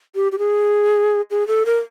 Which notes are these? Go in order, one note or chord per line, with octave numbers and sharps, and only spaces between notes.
G4
G4
G#4
G#4
A4
A#4